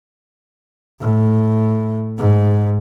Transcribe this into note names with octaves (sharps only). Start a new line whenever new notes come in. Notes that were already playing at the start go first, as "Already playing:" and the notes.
A2
G#2